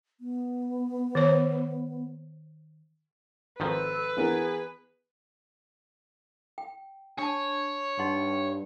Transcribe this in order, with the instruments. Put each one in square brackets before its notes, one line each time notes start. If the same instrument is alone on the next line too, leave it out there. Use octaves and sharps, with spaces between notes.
[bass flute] B3
[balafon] D#3 C5 C#5
[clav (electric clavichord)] G#1 D#3 F3 [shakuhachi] A4 [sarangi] B4
[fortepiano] E3 B3 A#4 [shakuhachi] G#4
[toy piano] G5
[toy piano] D4 A5 [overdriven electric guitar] C#5
[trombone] G2 [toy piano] D#4 F#5 C6